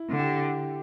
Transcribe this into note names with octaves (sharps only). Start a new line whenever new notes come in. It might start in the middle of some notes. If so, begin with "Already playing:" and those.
Already playing: E4
D3
G4